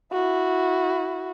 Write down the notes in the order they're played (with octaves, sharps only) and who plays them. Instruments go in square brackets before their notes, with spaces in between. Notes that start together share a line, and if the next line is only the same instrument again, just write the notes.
[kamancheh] E4 F#4